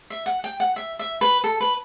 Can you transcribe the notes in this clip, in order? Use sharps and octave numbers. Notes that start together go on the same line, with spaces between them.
E5
F#5
G5
F#5
E5
E5
B4
A4
B4